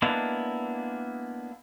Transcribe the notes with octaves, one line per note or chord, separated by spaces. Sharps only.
G#3 A#3 B3 D4 E4